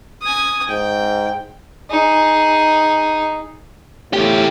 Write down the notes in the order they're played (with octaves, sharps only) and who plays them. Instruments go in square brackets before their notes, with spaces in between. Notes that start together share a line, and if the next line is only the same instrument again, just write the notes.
[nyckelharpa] G#5 D#6
[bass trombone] G#2 [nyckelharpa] G5
[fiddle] D#4 G#4
[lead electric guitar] E2 G4 [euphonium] A2